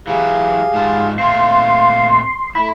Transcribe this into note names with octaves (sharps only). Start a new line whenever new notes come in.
E3 F#3 G4 G#4 F5
G#2 F3 A5
A#2 A3 C4 F5 C6
A3 E4 B5